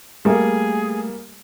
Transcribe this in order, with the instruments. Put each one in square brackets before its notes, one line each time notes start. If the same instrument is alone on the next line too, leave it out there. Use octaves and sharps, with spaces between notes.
[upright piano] G3 A#3 [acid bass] A3 [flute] G#4